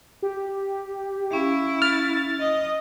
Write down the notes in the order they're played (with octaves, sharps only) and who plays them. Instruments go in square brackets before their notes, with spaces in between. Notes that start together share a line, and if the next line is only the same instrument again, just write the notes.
[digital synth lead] G4
[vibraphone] C#4 F5 [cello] E4
[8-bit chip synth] F6 [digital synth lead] A6
[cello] D#5